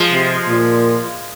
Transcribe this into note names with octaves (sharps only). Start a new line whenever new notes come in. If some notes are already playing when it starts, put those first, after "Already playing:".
Already playing: F3 G#3
C3
A#2